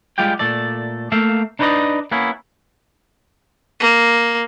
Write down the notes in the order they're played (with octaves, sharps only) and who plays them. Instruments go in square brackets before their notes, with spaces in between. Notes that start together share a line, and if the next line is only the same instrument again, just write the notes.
[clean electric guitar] G3 G#3 F4 G4 G5
A#2 A3 A4 D5
A3 A#3 E5 F5
D4 D#4 B4 C5 D5 D#5
A#3 B3 C#4 E4
[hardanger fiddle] A#3